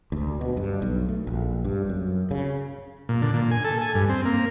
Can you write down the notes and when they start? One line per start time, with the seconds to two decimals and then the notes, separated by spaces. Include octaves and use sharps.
0.12 D2
0.41 B2
0.57 G2
0.82 B1
1.09 A3
1.27 A#1
1.64 G2
1.89 F#2
2.31 C#3
3.09 A#2
3.22 D3
3.34 A#2
3.51 G#5
3.65 A4
3.81 G#5
3.95 G2
4.09 C4
4.25 A#3